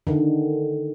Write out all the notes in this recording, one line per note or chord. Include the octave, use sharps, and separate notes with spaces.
D3 D#3